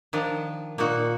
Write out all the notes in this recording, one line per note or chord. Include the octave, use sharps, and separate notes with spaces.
D#3 F3 D4
A#2 A#3 D#4 F#4